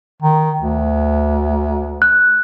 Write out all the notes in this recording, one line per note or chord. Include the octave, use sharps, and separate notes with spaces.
D#3
D2
F#6